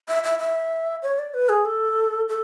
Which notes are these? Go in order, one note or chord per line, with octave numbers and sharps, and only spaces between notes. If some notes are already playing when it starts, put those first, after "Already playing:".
E5
E5
E5
C#5
D5
B4
G#4
A4
A4